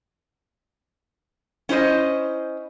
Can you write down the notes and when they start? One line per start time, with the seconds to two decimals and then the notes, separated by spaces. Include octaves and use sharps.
1.69 C#4 E4 C5 D#5